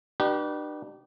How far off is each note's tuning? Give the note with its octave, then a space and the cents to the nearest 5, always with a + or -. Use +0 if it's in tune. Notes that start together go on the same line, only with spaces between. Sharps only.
D4 +40 G4 -30 B4 -30